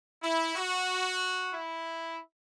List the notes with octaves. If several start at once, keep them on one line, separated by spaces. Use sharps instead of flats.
E4
F#4
E4